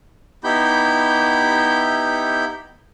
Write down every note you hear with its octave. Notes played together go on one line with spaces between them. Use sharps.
B3 D#4 E4 G4 B5 G6